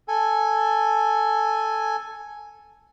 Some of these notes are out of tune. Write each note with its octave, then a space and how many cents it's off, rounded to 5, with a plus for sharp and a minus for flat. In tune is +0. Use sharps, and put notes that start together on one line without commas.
A4 +0 G#5 +0